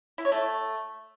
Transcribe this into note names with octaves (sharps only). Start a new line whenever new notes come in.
E4
C#5
A3